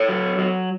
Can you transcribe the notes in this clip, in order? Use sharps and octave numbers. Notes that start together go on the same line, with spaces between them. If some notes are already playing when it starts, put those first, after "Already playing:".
Already playing: A4 C#5
F#3
F#3